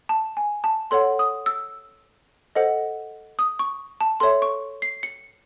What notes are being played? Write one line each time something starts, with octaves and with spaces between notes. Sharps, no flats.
A5
G#5
A5
A4 C#5 F#5 C6
D#6
E6
A4 C5 D#5 F#5
D#6
C#6
A5
A4 C#5 E5 C6
C#6
C7
C#7